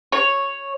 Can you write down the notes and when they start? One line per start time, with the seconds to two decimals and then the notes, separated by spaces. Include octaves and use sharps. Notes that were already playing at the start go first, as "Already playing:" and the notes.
0.12 C#5